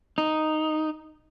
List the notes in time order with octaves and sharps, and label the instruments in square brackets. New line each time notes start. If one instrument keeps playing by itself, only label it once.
[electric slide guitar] D#4